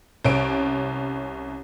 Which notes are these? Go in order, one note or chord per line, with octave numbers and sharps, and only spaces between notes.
C2 C#4 D7